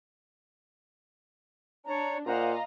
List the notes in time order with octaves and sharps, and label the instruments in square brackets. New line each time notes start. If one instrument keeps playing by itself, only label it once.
[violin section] D4 [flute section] C#5 D5 A#5
[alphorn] A#2 [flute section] C5 F#5 [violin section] D#5 F5 A#5